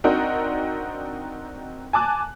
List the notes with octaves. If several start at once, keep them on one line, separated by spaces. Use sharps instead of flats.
C4 D4 D#4 F#4 A#4
G#5 A5 D6 F#6